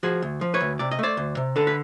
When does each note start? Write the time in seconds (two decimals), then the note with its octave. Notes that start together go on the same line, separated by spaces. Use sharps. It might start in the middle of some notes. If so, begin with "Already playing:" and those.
0.03 F3 F#4 G#4
0.22 D2
0.41 F3
0.54 B4 C#5
0.61 D2
0.79 C3 D5
0.91 D#5
0.99 A3 C5 D5
1.17 D2
1.37 C3
1.56 D3 A4 B4
1.67 B4